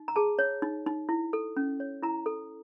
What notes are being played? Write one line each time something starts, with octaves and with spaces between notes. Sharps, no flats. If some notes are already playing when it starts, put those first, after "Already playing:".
Already playing: D#4
A#5
G#4 A5
C#5
D#4
D#4
E4
A4
C#4
C#5
E4 A#5
A4